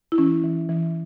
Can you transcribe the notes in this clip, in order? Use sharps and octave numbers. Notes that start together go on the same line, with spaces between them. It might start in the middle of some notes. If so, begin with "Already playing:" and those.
E4
E3 C#4
E3
E3